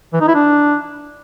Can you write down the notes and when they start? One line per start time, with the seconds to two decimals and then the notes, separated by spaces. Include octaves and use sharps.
0.13 E3
0.21 D#4
0.28 E4
0.35 D4